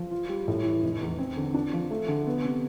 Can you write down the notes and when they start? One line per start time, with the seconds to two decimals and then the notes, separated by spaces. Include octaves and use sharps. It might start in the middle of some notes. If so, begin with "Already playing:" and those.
Already playing: F3
0.11 F4
0.29 G3
0.48 A2
0.65 E3
0.82 F1
1.01 E2
1.18 C4
1.37 D3
1.54 D4
1.73 F3
1.90 A3
2.08 D3
2.27 B3
2.44 C3